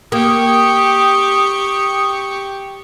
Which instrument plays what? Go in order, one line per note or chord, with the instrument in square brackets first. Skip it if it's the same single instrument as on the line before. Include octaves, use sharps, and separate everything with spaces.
[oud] A#3 [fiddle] G4 C#6 [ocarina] D#6